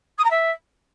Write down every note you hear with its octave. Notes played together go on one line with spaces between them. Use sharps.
D#6
A#5
E5